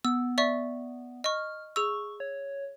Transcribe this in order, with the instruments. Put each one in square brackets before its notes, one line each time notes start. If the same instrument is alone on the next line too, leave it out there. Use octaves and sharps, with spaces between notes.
[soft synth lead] B3 [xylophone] E6
[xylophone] D5 E5 C#6
[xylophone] D#5 C#6 [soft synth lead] F6
[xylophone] G#4 E6 [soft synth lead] C#6
[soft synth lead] C#5